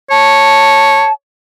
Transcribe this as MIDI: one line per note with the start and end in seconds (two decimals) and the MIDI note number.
0.11 1.07 73
0.11 1.13 81